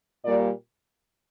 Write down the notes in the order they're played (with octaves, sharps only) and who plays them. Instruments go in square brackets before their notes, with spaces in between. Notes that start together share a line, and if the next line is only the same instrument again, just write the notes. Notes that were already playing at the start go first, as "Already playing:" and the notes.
[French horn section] A#2 G3 A#3 D5